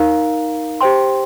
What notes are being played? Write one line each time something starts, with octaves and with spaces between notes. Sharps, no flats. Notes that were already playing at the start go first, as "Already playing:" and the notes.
Already playing: D#4 A#4 F5 A#5
G4 C5 G5 C6